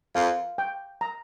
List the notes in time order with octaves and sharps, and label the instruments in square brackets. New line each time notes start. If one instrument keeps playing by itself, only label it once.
[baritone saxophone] F2 [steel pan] F5
[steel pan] G5
A#5